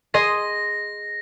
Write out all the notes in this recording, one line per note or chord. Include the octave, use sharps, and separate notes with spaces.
G#4 D#5 C6 A#6